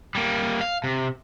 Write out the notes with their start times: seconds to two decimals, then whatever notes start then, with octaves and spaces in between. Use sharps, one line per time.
0.15 G3 A#3
0.61 F5
0.84 C3